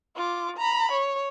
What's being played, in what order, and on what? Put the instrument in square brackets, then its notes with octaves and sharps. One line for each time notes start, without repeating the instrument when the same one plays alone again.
[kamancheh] F4 D6
A#5 B5
C#5